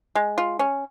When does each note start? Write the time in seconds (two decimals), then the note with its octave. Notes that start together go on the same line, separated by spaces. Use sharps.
0.15 G#3
0.38 F4
0.59 C#4